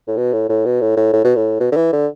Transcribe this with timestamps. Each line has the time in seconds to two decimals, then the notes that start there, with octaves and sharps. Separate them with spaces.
0.08 A2
0.17 B2
0.33 A2
0.49 A2
0.65 B2
0.81 A2
0.97 A2
1.13 A2
1.24 B2
1.36 A2
1.60 B2
1.72 D3
1.76 E3
1.93 D3